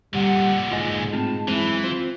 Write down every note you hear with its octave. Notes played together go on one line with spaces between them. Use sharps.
A#2 D3 G3 F#5
G#2 F4 D#5 G#5
A2 C4 F4 A5
F#2 E3 G#3 C4 E4
C4 F4 C5